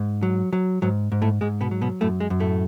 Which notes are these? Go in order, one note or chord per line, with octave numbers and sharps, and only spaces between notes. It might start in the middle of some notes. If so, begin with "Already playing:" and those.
Already playing: G#2
F#3
F#3
G#2 F#3
G#2
A2 A3
G#2 G#3
B2 B3
F#3
B2 B3
F#2 A2 A3
G#3
F#2
A2 A3